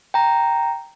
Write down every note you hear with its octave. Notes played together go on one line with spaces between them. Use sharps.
G5 A#5